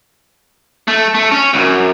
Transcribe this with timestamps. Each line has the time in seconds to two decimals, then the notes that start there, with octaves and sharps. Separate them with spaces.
0.88 A3
1.15 A3
1.32 C#4
1.54 C#2 F#2